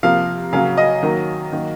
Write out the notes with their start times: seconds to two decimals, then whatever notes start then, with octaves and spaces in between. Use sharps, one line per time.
0.03 C3 F3 A#3 F5
0.53 C#3 F#3 A#3 F5
0.77 D#5
1.03 D#3 F#3 A#3
1.52 D#3 F#3 A#3